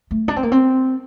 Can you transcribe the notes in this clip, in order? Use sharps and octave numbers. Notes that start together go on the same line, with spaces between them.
A3
D4
C4
A#3
C4